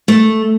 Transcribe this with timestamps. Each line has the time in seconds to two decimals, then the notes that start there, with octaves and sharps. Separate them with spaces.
0.08 A3